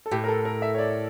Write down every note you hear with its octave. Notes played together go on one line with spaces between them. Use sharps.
A4
A2 G4
A#4
A4
A#4
E5
C#5
D5